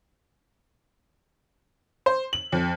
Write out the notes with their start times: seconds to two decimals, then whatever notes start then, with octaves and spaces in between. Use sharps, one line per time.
2.06 C5
2.33 F#7
2.52 F2